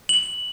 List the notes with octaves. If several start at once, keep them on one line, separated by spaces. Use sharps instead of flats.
F#7